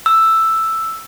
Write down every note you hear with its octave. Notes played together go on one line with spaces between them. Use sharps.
E6